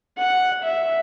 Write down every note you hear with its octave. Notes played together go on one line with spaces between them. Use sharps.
F#5
E5